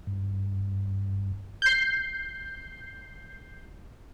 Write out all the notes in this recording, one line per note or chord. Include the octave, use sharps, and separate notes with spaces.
G2
G6 C7